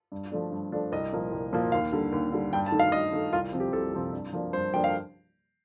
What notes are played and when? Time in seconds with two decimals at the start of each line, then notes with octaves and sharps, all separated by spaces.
0.12 G2
0.32 F3 A3 D4
0.52 G2
0.72 F3 A3 D4
0.92 C2 D#5
1.13 A#2 F3 A#3
1.32 C2
1.53 A#2 F3 A#3
1.72 D#2 F5
1.93 D3 G3
2.12 D#2
2.32 D3 G3
2.53 G2 G5
2.66 A5
2.72 D#3 A3
2.80 F5
2.92 G2 D#5
3.13 D#3 A3
3.33 C2 F4
3.52 C3 F3 C4
3.60 G4
3.73 C2 A4
3.93 C3 F3 C4
4.13 G2
4.33 F3 A#3 D4
4.53 G2 C5
4.73 F3 A#3 D4 G5
4.84 F5